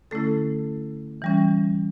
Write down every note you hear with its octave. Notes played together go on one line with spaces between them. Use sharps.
D3 A3 C#4 E4 A4
E3 G3 C#4